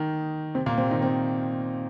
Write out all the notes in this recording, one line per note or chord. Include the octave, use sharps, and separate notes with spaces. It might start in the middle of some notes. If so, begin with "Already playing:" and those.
Already playing: D#3 D#4
C3 C4
A#2 A#3
C3 C4
D#3 D#4
C3 C4